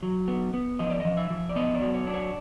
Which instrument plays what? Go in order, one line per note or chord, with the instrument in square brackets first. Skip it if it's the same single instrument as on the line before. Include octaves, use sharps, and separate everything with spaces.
[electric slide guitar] F#3
B3
B3
F3 D#5
D5
F3 D#5
E5
F3
D5
B3 D#5
D5
F#3
C#5
D4
C#5